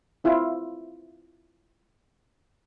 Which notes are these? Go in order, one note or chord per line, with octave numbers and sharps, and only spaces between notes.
C4 E4 F4